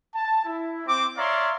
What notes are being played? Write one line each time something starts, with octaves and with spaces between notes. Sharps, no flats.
A5
E4
C4 D6
C#5 D5 E5 F5 A#5 C6